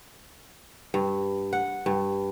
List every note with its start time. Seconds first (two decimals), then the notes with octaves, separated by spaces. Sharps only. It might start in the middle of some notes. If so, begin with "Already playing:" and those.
0.94 G2
1.53 F#5
1.86 G2